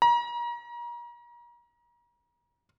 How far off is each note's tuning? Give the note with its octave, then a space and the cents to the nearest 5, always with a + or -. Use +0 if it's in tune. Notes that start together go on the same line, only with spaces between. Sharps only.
A#5 +35